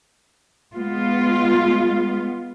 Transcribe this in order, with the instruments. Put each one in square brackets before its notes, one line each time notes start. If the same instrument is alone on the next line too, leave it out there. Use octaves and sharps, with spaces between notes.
[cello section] G#3 B3 F4